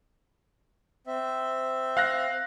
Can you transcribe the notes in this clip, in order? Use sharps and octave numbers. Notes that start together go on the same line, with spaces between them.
C4 E5
F5 F#6 A#6